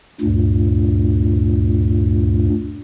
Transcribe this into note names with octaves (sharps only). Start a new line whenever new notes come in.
D2 G2 A#2